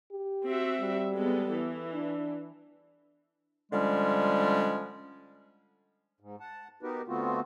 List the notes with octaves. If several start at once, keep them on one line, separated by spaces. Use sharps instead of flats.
G4
C4 F#4 E5
G3
G#3 B3 A4
E3
D4
D3 F3 G3 G#3 C#4
G#2
F#5 A5
B3 D#4 F#4 G4 A#4 B4
D3 A3 B3 C4 F4 F#4